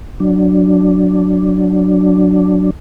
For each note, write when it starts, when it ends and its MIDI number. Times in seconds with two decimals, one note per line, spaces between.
0.20 2.70 54
0.20 2.70 62